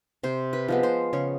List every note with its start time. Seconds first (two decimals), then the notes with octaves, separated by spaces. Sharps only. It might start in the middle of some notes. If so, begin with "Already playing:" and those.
0.23 C3 C5
0.53 B4
0.68 F3 G#3 B3
0.83 C5
1.13 C#3 C#5